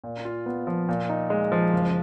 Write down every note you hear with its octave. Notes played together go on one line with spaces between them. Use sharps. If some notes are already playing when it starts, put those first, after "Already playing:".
A#2
F4
B3
F3
A#2
D#4
G#3
F3
F#1